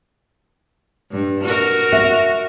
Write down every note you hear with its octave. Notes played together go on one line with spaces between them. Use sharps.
G2
F#4 A#4
E5